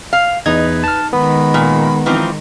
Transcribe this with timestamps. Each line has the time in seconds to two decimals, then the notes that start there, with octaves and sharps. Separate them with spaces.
0.13 F5
0.46 E2 D#4 B4 G#6
0.84 A5 F6
1.13 D#3 G#3 B3 B5
1.54 A#2
2.06 E3 F3 C4 D#4